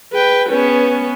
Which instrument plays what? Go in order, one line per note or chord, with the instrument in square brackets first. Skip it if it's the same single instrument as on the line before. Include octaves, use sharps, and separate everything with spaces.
[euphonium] G#4 [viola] B4 G5
[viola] B3 C#4 [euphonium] B4